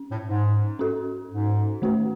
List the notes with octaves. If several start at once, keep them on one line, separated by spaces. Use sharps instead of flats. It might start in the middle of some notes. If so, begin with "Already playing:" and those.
Already playing: C#4
A2
G#2
C#4 F#4 A4
G#2
D#3 A3 C#4 F#4 B4